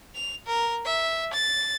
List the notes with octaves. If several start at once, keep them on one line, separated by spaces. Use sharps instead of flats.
F7
A#4
E5
A6